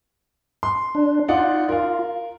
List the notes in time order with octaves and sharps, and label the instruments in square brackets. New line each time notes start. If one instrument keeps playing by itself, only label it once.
[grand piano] C6
[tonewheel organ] D4
[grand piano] D#4 D5 F#5 [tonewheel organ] F4
[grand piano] A#4 F5